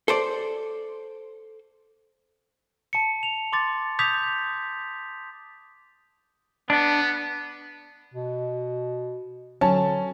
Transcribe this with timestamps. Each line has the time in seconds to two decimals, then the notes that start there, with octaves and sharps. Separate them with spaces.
0.08 A4 C5 D5
2.93 A5 C#7
3.23 F7
3.53 C6 D6 A6
3.99 D6 D#6 G6 G#6 B6 F7
6.70 B3 D4
8.14 B2
9.61 D3 F#3 C#4 A5